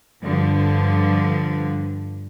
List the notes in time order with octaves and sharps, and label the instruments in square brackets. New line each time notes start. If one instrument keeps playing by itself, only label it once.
[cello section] G2 D3 F3